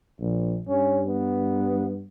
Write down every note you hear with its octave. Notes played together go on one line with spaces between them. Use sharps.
A#1
G2 C#4
B3